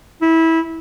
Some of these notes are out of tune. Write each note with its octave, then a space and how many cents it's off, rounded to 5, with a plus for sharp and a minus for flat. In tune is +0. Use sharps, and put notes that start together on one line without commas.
E4 -20